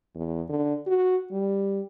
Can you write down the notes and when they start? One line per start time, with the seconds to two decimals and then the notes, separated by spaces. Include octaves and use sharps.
0.15 E2
0.49 D3
0.87 F#4
1.31 G3